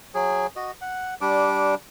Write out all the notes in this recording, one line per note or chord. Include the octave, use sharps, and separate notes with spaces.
F#3 G#4
F#4 D#5
F#5
G3 D4 D6